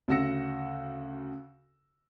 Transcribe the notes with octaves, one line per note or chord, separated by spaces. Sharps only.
D2 C#3 F#4 E6 A#6 C#7